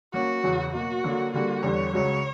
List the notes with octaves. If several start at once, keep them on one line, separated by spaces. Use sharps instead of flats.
F#3 A#3 C#4 F#4
E2 C#3 F#3 C#4
B2 F#3 A#3 F#4
D3 F#3 A#3
D3 G3 A#3 F#4
E2 D3 G3 C#5
C#2 C#3 F#3 C#5